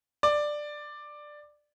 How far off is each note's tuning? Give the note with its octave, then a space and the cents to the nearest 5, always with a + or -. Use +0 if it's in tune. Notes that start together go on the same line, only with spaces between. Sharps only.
D5 +10